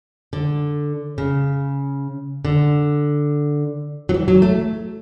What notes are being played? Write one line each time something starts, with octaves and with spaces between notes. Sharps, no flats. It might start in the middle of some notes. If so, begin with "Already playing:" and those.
D3
C#3
D3
F#3
E3
F#3
A3